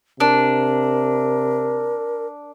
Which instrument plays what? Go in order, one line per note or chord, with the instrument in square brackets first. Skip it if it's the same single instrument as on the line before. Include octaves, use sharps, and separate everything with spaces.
[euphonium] C3 [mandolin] D4 [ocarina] A#4